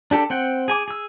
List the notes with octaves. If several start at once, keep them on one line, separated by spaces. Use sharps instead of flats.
D4 G4 A4
C4 F#5 G5
G#4 G#5 D6
G#4 E6